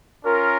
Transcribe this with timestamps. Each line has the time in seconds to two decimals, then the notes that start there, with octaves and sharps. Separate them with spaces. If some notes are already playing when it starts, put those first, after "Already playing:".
0.24 C#4 F4 A#4